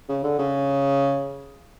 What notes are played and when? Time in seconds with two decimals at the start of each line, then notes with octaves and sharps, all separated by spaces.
0.09 C#3
0.23 D3
0.39 C#3